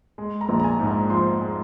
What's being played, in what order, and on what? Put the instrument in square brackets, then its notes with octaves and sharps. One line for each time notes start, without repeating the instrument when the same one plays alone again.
[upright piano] G#3
A#5
A#1
A#5
G#5
G#2
A#5
F3 C6
G#3